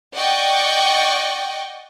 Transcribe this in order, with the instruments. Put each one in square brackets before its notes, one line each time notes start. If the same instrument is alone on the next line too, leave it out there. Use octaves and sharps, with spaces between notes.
[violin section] D5 D#5 F#5 G5 C#6 D6